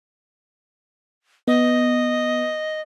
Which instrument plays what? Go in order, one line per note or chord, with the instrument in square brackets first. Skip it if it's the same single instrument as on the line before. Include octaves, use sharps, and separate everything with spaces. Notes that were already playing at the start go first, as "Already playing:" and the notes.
[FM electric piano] B3 [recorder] D#5